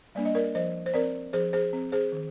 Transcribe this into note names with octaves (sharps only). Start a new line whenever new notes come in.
G3 A#3 D4 D5
D#5
A#4 D5
F3 C5 D#5
C5
C4 A#4 D5
F3 G#4 C5
G#4 C5
C4
G#4 C5
D#3